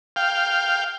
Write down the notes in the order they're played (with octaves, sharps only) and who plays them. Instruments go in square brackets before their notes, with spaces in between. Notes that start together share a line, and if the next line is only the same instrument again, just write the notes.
[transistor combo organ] F5 G5